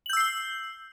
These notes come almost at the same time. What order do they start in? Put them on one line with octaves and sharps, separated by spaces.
F#7 G6 E6 C7 G7